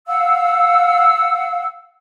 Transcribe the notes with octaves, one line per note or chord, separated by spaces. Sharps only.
F5 F#5 E6